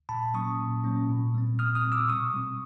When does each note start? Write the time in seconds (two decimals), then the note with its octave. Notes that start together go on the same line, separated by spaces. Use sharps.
0.09 A#2 A5 B5
0.34 F#3 A#3 C#4 C#6 D#6
0.60 A#2
0.84 F#3 A#3 C#4
1.09 A#2
1.34 G3 C4
1.59 A#2 D#6 F6
1.75 D#6 F6
1.85 G3 C4
1.92 D6 E6
2.09 B2 C#6 D#6
2.34 G3 C4